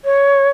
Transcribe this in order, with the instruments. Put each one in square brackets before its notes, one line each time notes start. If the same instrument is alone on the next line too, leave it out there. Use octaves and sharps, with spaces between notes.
[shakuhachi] C#5